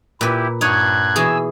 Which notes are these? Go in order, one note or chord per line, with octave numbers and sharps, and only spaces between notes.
A#2 E4 G4 B4
G2 D#4 C#5 F#6 G#6
B2 E3 G#4 G#5 E6